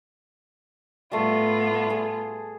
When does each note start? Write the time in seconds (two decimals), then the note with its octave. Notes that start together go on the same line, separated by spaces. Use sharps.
1.12 A2 G3 A3 B3 F4
1.90 G#4 A4